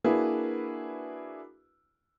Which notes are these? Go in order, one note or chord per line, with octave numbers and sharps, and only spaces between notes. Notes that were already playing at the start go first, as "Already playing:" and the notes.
A#3 D4 E4 F#4 G#4 B4